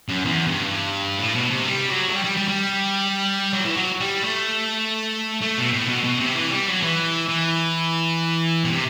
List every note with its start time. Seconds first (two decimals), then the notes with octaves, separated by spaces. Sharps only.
0.09 F#2
0.25 E2
0.48 G2
1.18 A2
1.35 B2
1.50 C3
1.65 G3
1.89 F#3
2.08 A3
2.13 G3
2.24 G3
2.37 G3
2.48 G3
3.53 F#3
3.65 E3
3.77 F#3
4.01 G3
4.24 A3
5.41 A3
5.57 B2
5.72 A2
5.88 B2
6.04 B2
6.20 C3
6.35 E3
6.51 G3
6.67 F#3
6.82 E3
7.29 E3
8.64 B2
8.70 C3